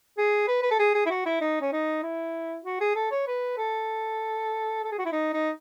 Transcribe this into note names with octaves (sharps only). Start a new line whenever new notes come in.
G#4
B4
B4
A4
G#4
G#4
E4
F#4
E4
D#4
C#4
D#4
E4
F#4
G#4
A4
C#5
B4
A4
A4
G#4
F#4
E4
D#4
D#4